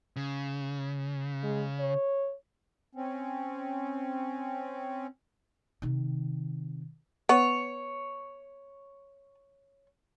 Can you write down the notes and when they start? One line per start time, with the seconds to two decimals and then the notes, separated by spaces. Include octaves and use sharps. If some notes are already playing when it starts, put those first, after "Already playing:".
0.16 C#3
1.43 G#3
1.80 C#5
2.95 C4 C#4
5.82 C3 D#3
7.29 B3 C#5